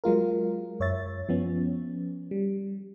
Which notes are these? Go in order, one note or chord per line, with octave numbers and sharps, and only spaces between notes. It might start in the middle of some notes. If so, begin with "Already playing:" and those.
F#3 G#3 F4 A#4
F#2 C#5 E5 A6
F3 B3 C#4
G3